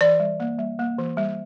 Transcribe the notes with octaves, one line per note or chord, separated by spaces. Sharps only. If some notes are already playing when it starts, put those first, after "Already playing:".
E3 D5
G3
A#3
G3
A#3
E3
G3